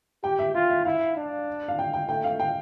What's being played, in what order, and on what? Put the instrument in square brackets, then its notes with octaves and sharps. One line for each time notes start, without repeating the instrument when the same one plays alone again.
[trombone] G4 [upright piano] G5
[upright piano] E5
[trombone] F4 [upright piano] E5
[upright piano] E5
[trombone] E4 [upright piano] F5
[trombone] D4
[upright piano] F5
G5
G5
[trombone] A3 [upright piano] G5
[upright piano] F5
G5